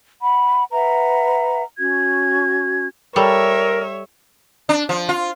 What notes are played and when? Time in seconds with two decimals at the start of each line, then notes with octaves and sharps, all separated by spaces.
0.22 F#5 B5
0.72 B4 E5 F#5 A#5
1.79 C#4 F#4 G#6
3.16 G3 A4 A#4 C#5 E5
4.69 D4
4.89 F3
5.09 F4